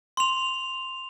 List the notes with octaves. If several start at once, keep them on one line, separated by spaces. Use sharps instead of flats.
C6 F7